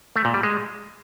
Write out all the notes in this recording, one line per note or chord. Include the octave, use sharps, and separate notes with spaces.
A3
A#2
G3
G#3